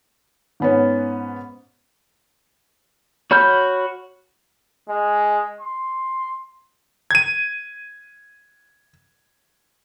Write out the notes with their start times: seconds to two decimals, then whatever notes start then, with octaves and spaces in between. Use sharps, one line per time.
0.60 G#2 B3 C#4
3.31 F#4 C#5 B5 F6 G6
4.89 G#3
5.61 C6
7.11 G#6 D#7